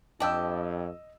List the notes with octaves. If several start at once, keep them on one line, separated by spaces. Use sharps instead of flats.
F2 D4 G4 D#5 E6